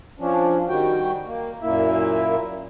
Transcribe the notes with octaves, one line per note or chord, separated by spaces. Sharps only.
F3 C#4 D4
D#3 G3 F#4 G5
A#3
F#2 A#2 A#3 E4 E5